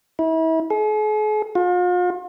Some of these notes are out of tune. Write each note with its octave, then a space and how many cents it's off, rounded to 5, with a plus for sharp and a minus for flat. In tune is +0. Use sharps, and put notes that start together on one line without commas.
E4 -35
G#4 +45
F4 +40